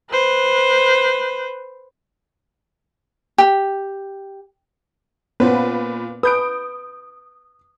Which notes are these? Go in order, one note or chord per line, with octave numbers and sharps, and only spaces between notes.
B4 C5
G4
A#2 B3 C#4 B4 C5
B4 D#6 G6 D7